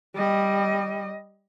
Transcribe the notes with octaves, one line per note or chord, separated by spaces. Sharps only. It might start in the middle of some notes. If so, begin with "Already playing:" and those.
G3 D#5